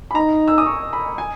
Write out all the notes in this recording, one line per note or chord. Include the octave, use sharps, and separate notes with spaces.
B5
D#4 A#5
E6
D#6
C#6
B5
G#5